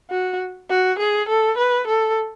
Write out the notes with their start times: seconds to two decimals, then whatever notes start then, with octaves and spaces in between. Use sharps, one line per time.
0.10 F#4
0.70 F#4
0.99 G#4
1.29 A4
1.58 B4
1.87 A4